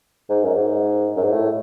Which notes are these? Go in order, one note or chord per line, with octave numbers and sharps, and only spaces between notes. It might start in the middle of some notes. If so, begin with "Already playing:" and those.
G#2
F#2
G#2
F#2
G#2
A2